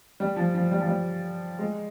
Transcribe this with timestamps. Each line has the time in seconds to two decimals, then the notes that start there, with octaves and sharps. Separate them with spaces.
0.20 G3
0.36 F3
0.55 F3
0.71 G3
0.80 F3
0.87 G3
1.59 G#3